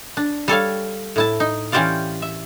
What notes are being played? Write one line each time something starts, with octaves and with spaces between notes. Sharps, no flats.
D4
G3 A4 C#5 F5
A2 E4 A5
D#4
E3 C#4 G4 C5 D5 F5
E5